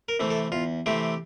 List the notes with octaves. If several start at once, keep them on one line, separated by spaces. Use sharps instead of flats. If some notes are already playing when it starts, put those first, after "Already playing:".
A#4
C3 E3 A3 C4
A4
E2 F4
C3 E3 A3 C4 G4